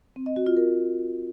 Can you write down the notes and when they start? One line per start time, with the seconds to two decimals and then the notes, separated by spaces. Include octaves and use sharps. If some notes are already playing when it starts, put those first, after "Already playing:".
0.16 C4
0.26 D#5
0.36 F#4
0.46 F4
0.57 A#4